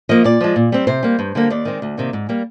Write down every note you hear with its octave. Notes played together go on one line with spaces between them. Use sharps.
F3 A#3 D#5
A#2 D5
F3 G#3
A#2
G3 C4
C3 C5
G3 A#3
G2
D3 G3 A#3
D#2 D5
D#3 G#3 C4
D2
C3 D#3 A#3
G#2
G3 A#3